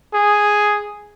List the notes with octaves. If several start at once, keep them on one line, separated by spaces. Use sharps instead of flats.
G#4